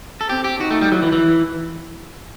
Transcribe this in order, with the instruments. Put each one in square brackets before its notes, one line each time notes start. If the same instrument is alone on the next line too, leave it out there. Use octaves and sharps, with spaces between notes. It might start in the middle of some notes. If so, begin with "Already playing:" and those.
[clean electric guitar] A4
[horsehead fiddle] C4 [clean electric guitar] G4
[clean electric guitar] G4
[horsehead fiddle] D#4 [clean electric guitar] F#4
[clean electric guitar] A3
G3
[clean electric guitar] F#3 [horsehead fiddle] E4
[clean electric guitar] E3
E3